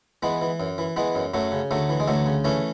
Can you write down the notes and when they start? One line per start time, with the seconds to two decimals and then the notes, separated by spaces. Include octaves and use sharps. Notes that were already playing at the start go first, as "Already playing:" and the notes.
0.23 E3 G#3 B3
0.41 E3
0.60 F#2
0.78 E3
0.96 E3 G#3 B3
1.15 F#2
1.34 F#2 F#3 A3
1.52 C#3
1.71 D2 F#3 A3
1.89 E3
2.00 G#3
2.08 D2 F#3 A3
2.26 C#3
2.45 E3 A3 C#4